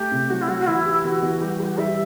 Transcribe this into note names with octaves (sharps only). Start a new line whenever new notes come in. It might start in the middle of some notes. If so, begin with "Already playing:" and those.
Already playing: A3 G4
C3
F#3 F#4
E4
F#3 F#4
F#4
E3 E4
G4
E4
E3 F#4
E3
G3 G4
F#4
G3 E4 G4
F#4
G3 E5